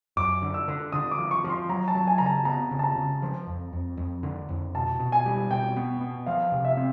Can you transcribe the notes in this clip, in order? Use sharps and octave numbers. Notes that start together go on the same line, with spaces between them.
F#2 D6
D3
E6
D3
D3 D#6
D6
F3
C#6
F3
C6
F#3 A#5
A5
F#3
G#5
C#3 A#5
A5
B3 A#5
C#3
A5
A#5
C#3
F3
F2
F2
F2
D3
F2
B2 A5
B2
G#5
G3
B2 G5
B3
B3
F3 F5
C3
E5
C4